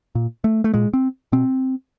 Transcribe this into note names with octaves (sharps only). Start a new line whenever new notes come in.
A#2
A3
A3
A#2 G#3
C4
B2 C4